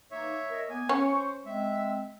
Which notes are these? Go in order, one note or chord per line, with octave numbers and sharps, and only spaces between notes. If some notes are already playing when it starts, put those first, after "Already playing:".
E3 A#3 D#4 C#5 E5
A#4 D#5
A#3 B3 G#5
C#4 C#6
C5
G#3 C4 E5